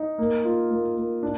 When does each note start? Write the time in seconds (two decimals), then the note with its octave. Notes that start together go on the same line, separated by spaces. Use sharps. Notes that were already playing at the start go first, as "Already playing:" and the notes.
Already playing: D#4
0.18 A#3
0.45 F4
0.70 A#3
0.96 A#3
1.23 D4